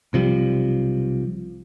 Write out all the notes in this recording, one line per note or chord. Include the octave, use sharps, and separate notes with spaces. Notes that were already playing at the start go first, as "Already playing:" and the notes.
B1 C3 F3 G3